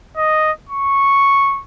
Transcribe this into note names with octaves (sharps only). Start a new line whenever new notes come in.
D#5
C#6